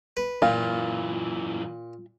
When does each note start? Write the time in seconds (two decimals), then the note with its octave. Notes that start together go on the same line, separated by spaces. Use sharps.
0.17 B4
0.42 F#2 A#2 E3 F4